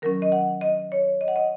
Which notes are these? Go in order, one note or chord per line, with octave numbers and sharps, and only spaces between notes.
D#3 F#3 C#4 A#4
D#5
F#5
D#5
C#5
D#5
F#5
D#5